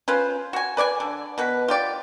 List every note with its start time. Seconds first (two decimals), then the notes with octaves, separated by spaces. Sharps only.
0.08 C#4 F4 B4 C5
0.53 F#4 G#5
0.77 B4 D5 F5 G#5
1.00 D3
1.38 B2 B3 B4
1.68 F4 G4 D5